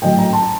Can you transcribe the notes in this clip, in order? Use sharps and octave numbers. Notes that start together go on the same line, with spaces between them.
A2 F#3 D#5 G5
G5 A#5
A5 C6